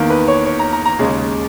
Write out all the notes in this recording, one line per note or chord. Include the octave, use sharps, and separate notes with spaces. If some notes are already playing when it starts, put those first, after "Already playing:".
Already playing: E2 D#3 A#3
B4
C#5
C#5
A#5
A#5
A#5
D#2 C#3 G#3